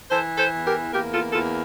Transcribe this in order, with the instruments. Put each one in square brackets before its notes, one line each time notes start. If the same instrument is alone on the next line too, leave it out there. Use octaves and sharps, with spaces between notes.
[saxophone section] E3 A4 C5
A4 C5
E2
G4 A#4
A#3 G4 A#4
F4 A4
E2 F4 A4